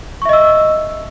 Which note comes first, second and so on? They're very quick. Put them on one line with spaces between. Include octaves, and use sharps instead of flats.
C#6 E5 D#5 E6